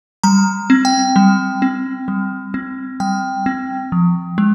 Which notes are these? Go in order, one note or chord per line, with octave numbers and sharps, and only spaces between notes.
G3 A#5
C4
G5
G3
C4
G3
C4
G3 G5
C4
F3
G#3